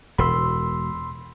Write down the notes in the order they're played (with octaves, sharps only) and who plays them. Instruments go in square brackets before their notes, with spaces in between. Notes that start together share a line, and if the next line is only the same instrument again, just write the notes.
[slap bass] E1 [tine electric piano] B5 C6 E6